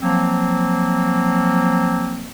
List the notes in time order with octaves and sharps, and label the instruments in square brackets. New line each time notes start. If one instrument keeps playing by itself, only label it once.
[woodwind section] F3 F#3 A#3 C4